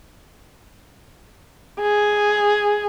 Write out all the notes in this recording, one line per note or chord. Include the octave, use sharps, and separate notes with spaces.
G#4